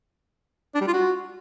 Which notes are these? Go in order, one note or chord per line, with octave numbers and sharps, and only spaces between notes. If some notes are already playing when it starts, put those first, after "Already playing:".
D4
G3
F4
F#4